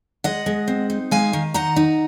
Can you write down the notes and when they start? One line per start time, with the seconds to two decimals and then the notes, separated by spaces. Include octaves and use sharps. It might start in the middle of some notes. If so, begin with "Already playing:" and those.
0.24 G#3 D#5 F#5
0.46 G#3
0.68 C4
0.90 D#4
1.11 G#3 F5 G#5
1.33 D#3
1.54 D#4 F#5 A#5
1.76 D#4